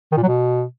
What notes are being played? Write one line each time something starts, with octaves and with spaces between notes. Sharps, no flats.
D#3
A#2
F#3
B2